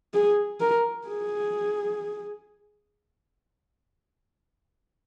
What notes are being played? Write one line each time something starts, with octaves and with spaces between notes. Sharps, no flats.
G#4
A#4
G#4